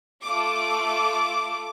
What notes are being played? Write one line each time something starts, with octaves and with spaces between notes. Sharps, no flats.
A3 F4 A4 D6